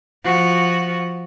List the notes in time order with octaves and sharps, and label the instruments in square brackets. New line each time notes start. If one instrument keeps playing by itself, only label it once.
[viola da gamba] F3 F#4